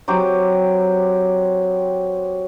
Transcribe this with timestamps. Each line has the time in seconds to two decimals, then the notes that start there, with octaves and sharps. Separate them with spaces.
0.08 F#3 C4 G4